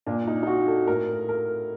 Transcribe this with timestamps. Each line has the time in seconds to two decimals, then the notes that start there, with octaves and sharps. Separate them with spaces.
0.07 A#2 D4
0.27 D#4
0.43 D#4
0.47 F#4
0.67 A4
0.87 A2 A#4
1.29 A#4